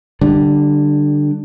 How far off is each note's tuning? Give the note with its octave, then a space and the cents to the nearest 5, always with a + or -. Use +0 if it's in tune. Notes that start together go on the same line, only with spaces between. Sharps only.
D3 +10 G3 -10